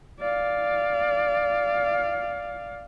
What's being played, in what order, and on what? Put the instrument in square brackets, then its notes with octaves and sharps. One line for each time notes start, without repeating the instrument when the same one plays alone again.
[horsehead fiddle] D5 F5